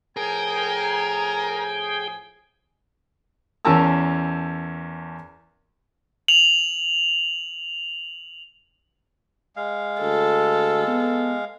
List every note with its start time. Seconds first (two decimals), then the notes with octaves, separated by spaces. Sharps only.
0.17 A2 F3 G#4 A#4 G5 G#5
3.65 E2 C#4 A#4 A5 A#5 E6
6.28 F7 F#7
9.56 G#3 F5
10.01 D2 A4
10.88 B3